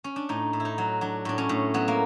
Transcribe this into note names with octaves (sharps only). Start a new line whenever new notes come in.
C#4
D4
A2 D#4
A2
E4
D#4
F#3
F#3 D4
A2 D4
C#4
A2
F#3 B3
A#3